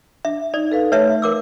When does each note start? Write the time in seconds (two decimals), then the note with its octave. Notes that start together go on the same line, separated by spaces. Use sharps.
0.25 D4 E5
0.54 D#4 D5
0.72 A4 B4 F5
0.92 A3 B4 C#5 E5
1.22 A#4 D6 E6